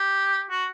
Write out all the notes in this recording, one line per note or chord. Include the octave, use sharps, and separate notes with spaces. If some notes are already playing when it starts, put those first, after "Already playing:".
Already playing: G4
F#4